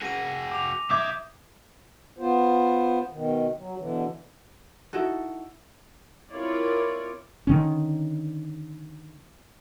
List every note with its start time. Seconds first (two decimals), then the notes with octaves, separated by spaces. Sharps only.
0.02 F#4 G#4 A#6 D#7
0.51 D6 F7
0.90 B1 E5 D6 D#6 G6 G#6
2.19 B3 F4 C5
3.11 B2 D#3
3.57 F#3
3.78 B2 D3 E3
4.93 D#4 E4 F#4 A4
6.32 C4 E4 F4 A#4 C#5 D5
7.47 D3 D#3 C#4